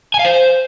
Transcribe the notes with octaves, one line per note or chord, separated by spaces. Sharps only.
G#5
F5
C5